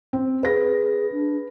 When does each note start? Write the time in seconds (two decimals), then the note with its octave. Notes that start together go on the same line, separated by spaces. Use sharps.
0.13 C4
0.43 G#4 B4 A#6
1.12 D4